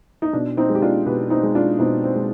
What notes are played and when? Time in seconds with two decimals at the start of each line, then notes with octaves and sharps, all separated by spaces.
0.22 D#4
0.33 B2 D4
0.57 C4 D#4
0.69 G#3
0.75 G4
0.82 D4 F4
1.06 B2 G4 B4
1.30 C4 D#4
1.43 G#3
1.55 D4 F4
1.78 B2 C4 D#4
2.03 C4
2.15 G#3